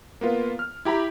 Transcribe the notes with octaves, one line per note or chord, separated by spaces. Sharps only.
A#3 B3 F4
F6
E4 G4 A#5 B5